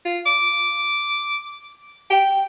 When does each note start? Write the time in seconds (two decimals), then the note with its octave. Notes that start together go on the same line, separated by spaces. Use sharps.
0.05 F4
0.26 D6
2.11 G5